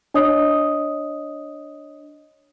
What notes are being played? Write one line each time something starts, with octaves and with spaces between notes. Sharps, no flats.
D4 C#5 D#5 D#6